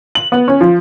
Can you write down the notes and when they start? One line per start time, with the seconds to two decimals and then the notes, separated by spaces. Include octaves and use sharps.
0.15 F#7
0.32 B3
0.48 C#4
0.61 F3